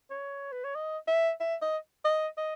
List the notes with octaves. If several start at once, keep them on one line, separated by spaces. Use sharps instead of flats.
C#5
B4
C#5
D#5
E5
E5
D#5
D#5
D#5